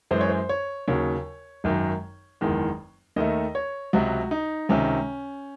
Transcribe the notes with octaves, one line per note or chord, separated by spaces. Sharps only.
F#2 E3 G#3 C5
C#5
C5
C#5
D#2 C#3 F#3 C#5
G#1 F#2 D#3 F#3
F#1 E2 D#3 G#3
D#2 D#3 A3 D#5
C#5
C#2 C3 F#3 F#4
D#4
C#2 C3 D#3 C#4